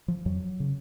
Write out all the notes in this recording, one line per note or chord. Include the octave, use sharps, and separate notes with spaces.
F3
F2 F#3
C#3